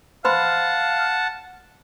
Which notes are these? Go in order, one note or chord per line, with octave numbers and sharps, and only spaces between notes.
C5 F5 F#5 A5 B5 C6